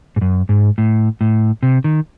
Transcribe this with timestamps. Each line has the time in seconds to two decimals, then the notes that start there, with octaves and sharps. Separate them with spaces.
0.16 G#2
0.21 F#2
0.49 G#2
0.78 A2
1.21 A2
1.63 C3
1.84 D#3